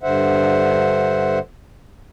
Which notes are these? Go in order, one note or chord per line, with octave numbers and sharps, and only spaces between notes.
G2 D3 C5 E5 F#5